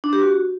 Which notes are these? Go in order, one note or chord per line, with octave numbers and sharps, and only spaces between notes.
D4
G4
F#4